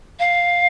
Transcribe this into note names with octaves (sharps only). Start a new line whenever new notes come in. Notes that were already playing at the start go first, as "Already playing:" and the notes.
F5